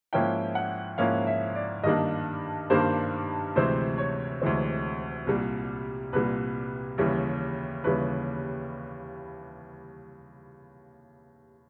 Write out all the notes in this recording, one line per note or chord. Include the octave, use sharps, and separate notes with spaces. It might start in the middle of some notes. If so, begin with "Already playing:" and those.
G#2 F3 A#3 C#4 E4 G5
F#5
G#2 F3 A#3 C#4 E4 F5
E5
D5
G2 D#3 G3 A#3 D4 D#5
G2 D#3 G3 A#3 D4 C5
D2 C3 E3 G#3 C4 C5
C#5
D2 C3 E3 G#3 C4
C2 A#2 G3
C2 A#2 G3 B4
D#2 C#3 E3 G3
D#2 C#3 E3 G3 B4